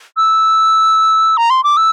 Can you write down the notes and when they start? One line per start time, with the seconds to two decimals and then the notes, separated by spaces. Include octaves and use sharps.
0.17 E6
1.37 A#5
1.50 C6
1.64 D6
1.77 E6